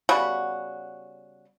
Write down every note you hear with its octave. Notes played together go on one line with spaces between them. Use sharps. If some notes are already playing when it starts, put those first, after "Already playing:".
C#3 G3 B3 F#4